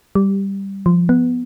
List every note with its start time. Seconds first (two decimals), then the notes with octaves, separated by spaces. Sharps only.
0.15 G3
0.86 F3
1.09 B3